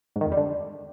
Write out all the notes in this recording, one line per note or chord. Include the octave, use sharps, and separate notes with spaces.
G#2
D#3
F2
G3
D3